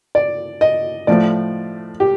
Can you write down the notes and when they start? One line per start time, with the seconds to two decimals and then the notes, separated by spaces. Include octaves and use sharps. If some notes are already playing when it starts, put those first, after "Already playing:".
0.15 D5
0.61 D#5
1.07 A2 F3 A3 D5
2.00 G4